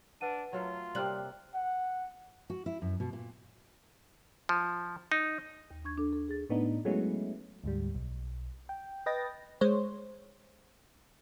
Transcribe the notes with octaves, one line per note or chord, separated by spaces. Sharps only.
D4 B4 F#5 D#7
F#3 A3 F4 A#4
C3 G3 A#3 C4 F6 F#6 F#7
F#5
F#4
E4
F#2
B2
A#2
F3
D#4
D#2
D4 C#6 G#6
D4 A4
A4
G#4 A6
A2 B3 D4 D#4
F#3 G#3 A3 B3 C#4 E4
D2 G#2 G3
B1
G5
B4 D#5 G5 A6 A#6
G#3 C5 C#5